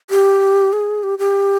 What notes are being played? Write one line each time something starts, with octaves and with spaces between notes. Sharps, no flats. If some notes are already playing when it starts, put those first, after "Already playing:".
G4
G#4
G4
G4